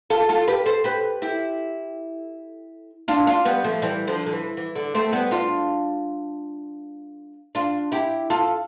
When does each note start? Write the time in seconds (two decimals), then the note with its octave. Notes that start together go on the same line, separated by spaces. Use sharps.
0.10 F4 A4
0.29 F4 A4
0.48 G4 B4
0.66 A4 C5
0.84 G4 B4
1.22 E4 G4
3.08 D4 F4
3.27 D4 F4
3.45 G3 B3
3.64 F3 A3
3.82 E3 G3
4.07 D3 F3
4.26 D3
4.33 E3
4.57 E3
4.76 D3
4.94 A3 C4
5.13 G3 B3
5.31 D4 F4
7.55 D4 F4
7.92 E4 G4
8.30 F4 A4